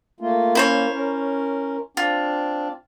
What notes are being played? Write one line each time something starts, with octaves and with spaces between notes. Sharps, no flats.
A3 A#3 F4
A#3 C#4 E4 C5 C#5
C#4 A#4
C4 D4 F4